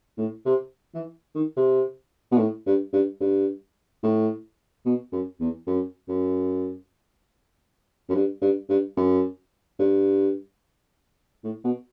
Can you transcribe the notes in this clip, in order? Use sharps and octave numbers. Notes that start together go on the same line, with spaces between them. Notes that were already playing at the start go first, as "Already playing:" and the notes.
A2
C3
E3
D#3
C3
B2
A2
G2
G2
G2
A2
B2
F#2
E2
F#2
F#2
F#2
G2
G2
G2
F#2
G2
A2
B2